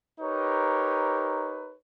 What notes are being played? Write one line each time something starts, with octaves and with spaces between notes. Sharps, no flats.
D#4 G4 A#4 B4 C#5